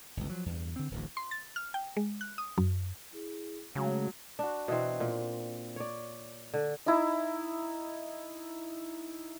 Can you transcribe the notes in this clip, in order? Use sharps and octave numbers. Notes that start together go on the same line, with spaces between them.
G1 C#2
F3 F#3
E2 G2
D3 C4
D1 A1 D2
C6
A6
F6
G5
G#3
F#6
D#6
F#2
E4 G#4
C#3 F#3 G#3 A3
D4 F#4
B2 E3 C4
A#2
C#5 D5
D3
D#4 E4